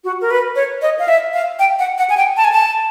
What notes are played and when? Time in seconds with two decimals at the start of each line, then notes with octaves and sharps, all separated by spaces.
0.04 F#4
0.21 A#4
0.31 B4
0.56 C#5
0.82 D#5
0.99 F5
1.08 E5
1.34 F5
1.59 G5
1.79 F#5
1.98 F#5
2.10 G#5
2.17 G5
2.37 A5
2.44 G#5
2.52 A5